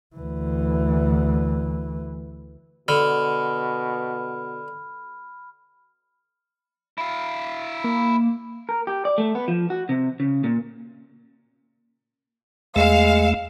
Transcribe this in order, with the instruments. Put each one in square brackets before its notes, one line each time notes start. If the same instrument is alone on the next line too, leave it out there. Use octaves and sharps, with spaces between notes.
[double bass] D2 E3
[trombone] B2 [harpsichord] D3 [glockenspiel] B5 F6
[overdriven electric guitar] E4 F5
[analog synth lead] A#3
[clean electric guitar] A#4
G4
D5
A3
B3
F3
F#4
C3
C#3
A#2
[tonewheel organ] E2 A3 [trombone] G#3 [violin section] F5